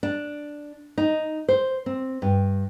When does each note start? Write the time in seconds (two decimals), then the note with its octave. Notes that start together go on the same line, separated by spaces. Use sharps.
0.03 D4
0.98 D#4
1.48 C5
1.86 C4
2.22 G2